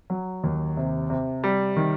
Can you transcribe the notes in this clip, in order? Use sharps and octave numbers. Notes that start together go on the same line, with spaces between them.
F#3
D#2
C3
C3
G3
D#3